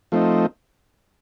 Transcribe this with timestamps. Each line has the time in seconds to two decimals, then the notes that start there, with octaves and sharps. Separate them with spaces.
0.12 F3 A3 C4 D#4